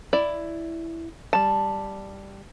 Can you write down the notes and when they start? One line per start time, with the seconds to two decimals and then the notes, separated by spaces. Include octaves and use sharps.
0.13 E4 D5
1.33 G3 A5